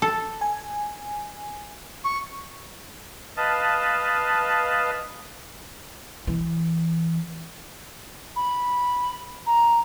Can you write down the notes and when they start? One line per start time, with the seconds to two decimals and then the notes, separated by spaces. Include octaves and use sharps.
0.02 A4
0.41 G#5
2.05 C#6
3.37 B4 D#5 F5 A5
6.27 E3
8.36 B5
9.46 A#5